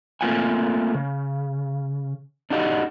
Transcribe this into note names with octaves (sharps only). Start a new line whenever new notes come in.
A3 A#3 C4 F4 F#5 G#5
C#3
D4 D#4 F#4 G4 D#5